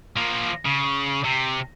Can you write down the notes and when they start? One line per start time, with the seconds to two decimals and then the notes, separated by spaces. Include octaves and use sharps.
0.16 F3 A#3
0.65 C#3
1.24 C3